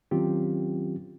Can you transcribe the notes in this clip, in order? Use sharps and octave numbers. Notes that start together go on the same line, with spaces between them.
D#3 F#3 C4 C#4 F4 G4